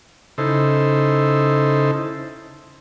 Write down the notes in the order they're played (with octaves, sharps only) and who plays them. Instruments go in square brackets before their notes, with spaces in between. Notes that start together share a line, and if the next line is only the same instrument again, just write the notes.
[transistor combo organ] C#3 D#4 E4 A4 C5